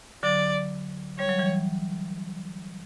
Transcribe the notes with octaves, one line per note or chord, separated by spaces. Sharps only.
D3 F#3 D5
G3 C#5
F#3
E3 G3